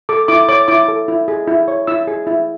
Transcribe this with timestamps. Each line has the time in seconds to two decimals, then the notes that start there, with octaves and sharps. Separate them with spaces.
0.09 A4 D6
0.28 E4 D6
0.49 C#5 D6
0.68 E4 D6
0.88 A4
1.08 E4
1.28 G#4
1.48 E4
1.68 C#5
1.87 E4 E6
2.07 G#4
2.27 E4